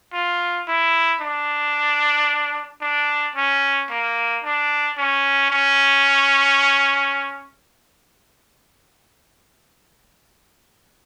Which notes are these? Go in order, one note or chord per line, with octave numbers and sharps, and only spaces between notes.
F4
E4
D4
D4
C#4
A#3
D4
C#4
C#4